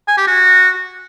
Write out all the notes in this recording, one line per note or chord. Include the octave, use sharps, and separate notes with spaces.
G#5
G4
F#4